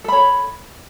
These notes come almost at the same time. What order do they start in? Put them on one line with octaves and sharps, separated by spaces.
A4 B5 C#5